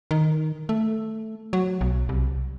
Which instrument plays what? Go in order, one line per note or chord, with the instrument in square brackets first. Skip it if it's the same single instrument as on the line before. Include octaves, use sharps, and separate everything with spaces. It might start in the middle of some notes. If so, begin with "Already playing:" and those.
[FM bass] D#3
A3
F#3
B1
C2